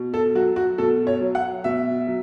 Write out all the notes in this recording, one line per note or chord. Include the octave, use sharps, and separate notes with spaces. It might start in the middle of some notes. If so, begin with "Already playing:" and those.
Already playing: B2
A4
F#3 F#4
F#4
B2 A4
C#5
F#3
F#5
B2 E5
F#3